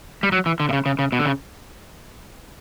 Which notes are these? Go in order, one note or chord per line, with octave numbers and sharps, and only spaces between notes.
G3
F#3
E3
D3
B2
C#3
C#3
C#3
B2
D3
C#3